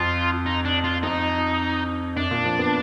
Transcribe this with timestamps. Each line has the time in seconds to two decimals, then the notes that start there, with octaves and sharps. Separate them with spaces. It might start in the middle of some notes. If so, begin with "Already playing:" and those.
Already playing: F2 F4
0.46 D#4
0.65 D4
0.84 F4
1.03 F2 D#4
2.16 F#2 D4
2.31 A#2
2.45 F3
2.59 B3